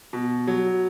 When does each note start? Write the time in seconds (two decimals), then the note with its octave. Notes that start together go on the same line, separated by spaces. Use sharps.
0.13 B2
0.47 F#3